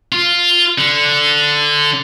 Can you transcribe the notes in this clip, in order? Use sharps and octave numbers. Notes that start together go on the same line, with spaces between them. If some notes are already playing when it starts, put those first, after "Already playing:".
F4
D3